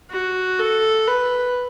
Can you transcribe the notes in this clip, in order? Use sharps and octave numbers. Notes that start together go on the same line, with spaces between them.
F#4
A4
B4